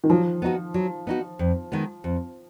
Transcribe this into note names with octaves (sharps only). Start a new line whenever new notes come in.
D#3
F3 F#3
B3 D#4 F#4
F#3
B3 D#4 F#4
F2
D#3 G#3 B3
F2